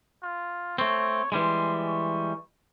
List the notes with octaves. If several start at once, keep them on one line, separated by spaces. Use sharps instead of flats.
F4
A3 C4 C#5
E3 G3 G#3 C6
C#6